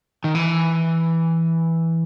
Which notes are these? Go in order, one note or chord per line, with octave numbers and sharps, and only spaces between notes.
D#3
E3